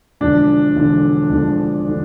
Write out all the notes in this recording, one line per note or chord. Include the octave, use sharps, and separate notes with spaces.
E1 E2 D3 F3 D4
E1 E2 D3 F3
E1 E2 D3 F3
D3 F3